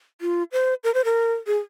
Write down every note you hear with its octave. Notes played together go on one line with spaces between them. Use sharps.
F4
C5
A#4
C5
A#4
G#4